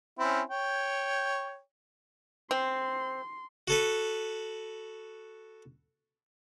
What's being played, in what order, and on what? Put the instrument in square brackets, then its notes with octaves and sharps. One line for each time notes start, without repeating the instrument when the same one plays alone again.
[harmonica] C4 C#4 E4
C#5 G5
[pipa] C4 [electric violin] C6
[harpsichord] F#4 A4 B4